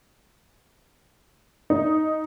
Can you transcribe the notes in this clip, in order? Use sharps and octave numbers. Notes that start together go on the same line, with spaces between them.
D#4